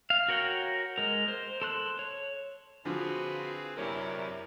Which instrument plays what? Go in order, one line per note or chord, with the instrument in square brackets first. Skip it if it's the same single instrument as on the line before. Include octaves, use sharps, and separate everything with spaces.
[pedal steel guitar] F5
F#4 A#4 C#5 F#5 G5
G#3 A#4
C5
A4 C6 F#6
C#5
[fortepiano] D3 F3 [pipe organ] C4 G#4 B4 [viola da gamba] F4 F#4
[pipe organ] F#2 C3 [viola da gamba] E4 G4 D5 [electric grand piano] A#4 C#5 G#5